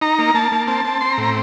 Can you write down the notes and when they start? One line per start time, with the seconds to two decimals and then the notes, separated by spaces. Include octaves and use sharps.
0.01 D#4 A#5
0.19 A#3
0.34 A#3 A5
0.52 A#3
0.67 C4 A5
0.85 C4
1.01 C4 C6
1.13 A#5
1.18 A2
1.23 A#5